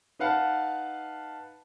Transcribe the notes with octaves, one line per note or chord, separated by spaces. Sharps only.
D#4 B4 F5 F#5 A5